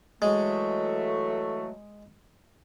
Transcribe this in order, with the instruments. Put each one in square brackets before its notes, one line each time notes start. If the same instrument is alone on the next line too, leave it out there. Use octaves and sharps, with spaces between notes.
[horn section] E3 F#3 A3 [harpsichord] G#3